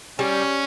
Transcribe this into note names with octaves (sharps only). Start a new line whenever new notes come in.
G3 C#4